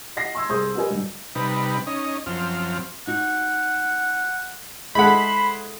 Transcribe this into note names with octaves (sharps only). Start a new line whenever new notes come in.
D#5 F#5 A#6 C7
C6 E6 G#6
C2 G#4 C5 C6 D#6 G6
F#4 G4 A#4 B4 D#5 G#5
G2 D3
C3 G3 D#4 B4
C#4 D#4 D#5
F#2 F3 C4 F6
D#4 F#4 F#5
G#3 E4 A4 C5 F#5 B5